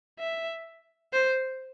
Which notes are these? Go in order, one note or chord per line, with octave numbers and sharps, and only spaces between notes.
E5
C5